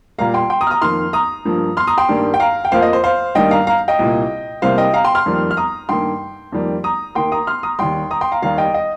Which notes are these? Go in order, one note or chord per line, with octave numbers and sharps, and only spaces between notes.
A#2 G3 A#3 F5 A#5
G5 C6
G5 C6
A#5 D#6
F6
A#5 D#6
F2 D#3 A#3 C6 F6
A#5 D#6
G2 F3 A#3
C6 F6
A#5 D#6
G5 C6
G2 D#3 G3 A#3
G5
F5 A#5
G5
F2 F3 A#3 C5 F5
D#5
C5
C5 F5
G2 D#3 G3 A#3 D#5 G5
F5 A#5
F5 A#5
D#5 G5
C2 A#2 A#3
C2 C3 G3 A#3 C5 F5
D#5 G5
F5 A#5
G5 C6
C6 F6
F2 D#3 G3 A#3
F6
A#5 D#6
G2 D#3 A#3 G5 C6
F2 D#3 G3 A#3
A#5 D#6
D#2 D#3 A#3 G5 C6
A#5 D#6
C6 F6
A#5 D#6
D#2 D#3 G3 G5 C6
A#5 D#6
G5 C6
F5 A#5
D#2 D#3 G3 F5 A#5
D#5 G5
D#5